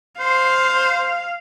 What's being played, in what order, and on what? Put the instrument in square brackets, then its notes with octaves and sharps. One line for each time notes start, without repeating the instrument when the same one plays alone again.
[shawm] C5 [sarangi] F5